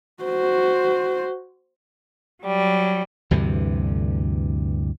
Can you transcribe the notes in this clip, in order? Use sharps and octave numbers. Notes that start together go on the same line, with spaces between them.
F#4 C5
F#3 G3
D2 G2 C3 E3